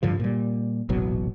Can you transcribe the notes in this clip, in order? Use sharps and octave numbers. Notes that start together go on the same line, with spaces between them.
G2 D3 F3
A#2 G3
D#1 A1 B2 F#3